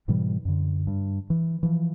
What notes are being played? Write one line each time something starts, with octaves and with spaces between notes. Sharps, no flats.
G#2 B2 E3 G3
F#2 D3
G2
E3
E3 F3